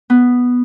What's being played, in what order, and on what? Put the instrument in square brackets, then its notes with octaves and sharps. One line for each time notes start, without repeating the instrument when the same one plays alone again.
[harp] B3